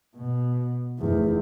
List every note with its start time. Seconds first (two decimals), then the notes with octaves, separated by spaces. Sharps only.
0.16 B2
0.99 F1 E2